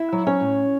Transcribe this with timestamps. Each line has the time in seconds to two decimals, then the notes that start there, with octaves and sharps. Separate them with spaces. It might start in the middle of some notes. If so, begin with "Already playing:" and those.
Already playing: E4 E5
0.12 F#3
0.27 C#4 C#5
0.40 A2